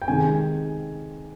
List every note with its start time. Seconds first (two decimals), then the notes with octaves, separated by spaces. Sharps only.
0.02 G5
0.08 C3 D#3 G#3 G#5